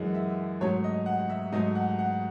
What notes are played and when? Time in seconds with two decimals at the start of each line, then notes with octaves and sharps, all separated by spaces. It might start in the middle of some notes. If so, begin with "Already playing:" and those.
Already playing: F#2 E3 G#3 F#5
0.15 E5
0.61 G#2 F#3 A3 C#5
0.84 D#5
1.06 F#5
1.30 E5
1.52 G#2 F#3 A3 D#5
1.75 F#5
1.99 F#5